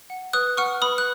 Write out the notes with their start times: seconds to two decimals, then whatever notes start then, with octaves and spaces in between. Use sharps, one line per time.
0.10 F#5
0.33 B4 D#6 F#6
0.57 F#5 C#6 F6
0.82 B4 B5 D#6
0.98 F#6